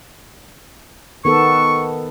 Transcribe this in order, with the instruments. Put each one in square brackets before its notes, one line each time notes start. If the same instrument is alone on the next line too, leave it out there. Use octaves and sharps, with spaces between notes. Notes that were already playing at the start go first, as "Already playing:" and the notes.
[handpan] D#3 B3 A4 [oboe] C#6